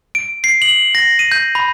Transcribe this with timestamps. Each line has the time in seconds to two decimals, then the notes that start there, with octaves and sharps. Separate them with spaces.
0.15 D7
0.44 C7
0.62 F#7
0.95 A#6
1.19 D#7
1.32 G6
1.55 B5